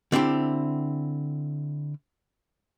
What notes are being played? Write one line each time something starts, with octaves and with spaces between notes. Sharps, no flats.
D3 C4 E4 G4